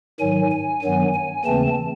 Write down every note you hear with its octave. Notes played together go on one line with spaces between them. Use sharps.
G#2 D#3 F#3 G#5
G#5
G2 D#3 F#3 B3
G#5
D#2 C#3 E3 A3 C4 A5